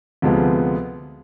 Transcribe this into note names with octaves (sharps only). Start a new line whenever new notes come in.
D2 C3 F3 G#3 B3